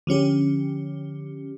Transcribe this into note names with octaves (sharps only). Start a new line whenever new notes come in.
D3 F3 C#4 G4